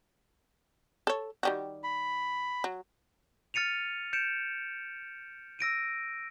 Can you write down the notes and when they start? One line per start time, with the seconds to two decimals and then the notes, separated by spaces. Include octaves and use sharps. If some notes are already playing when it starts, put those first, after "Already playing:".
1.07 A4 C#5
1.43 D#3 G3 F#4
1.84 B5
2.64 F#3
3.54 F6 A6 C#7 D#7 F7
4.13 G6 C#7 D7 E7
5.59 E6 A#6 D7 D#7